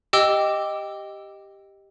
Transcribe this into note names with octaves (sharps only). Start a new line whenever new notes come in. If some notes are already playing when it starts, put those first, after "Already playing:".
G4 D#5 G5 D6 E6 G7